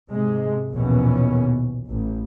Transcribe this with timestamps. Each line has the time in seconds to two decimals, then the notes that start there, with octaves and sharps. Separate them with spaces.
0.11 G#2 C3 G#3
0.73 A#1 D#2 B2 E3 B3 C#4
1.88 A1